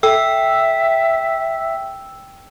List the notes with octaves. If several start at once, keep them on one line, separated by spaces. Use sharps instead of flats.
A4 E5 G5 E6